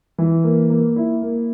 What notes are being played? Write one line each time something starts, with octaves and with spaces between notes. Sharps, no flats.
E3
A#3
A#3
E4
A#3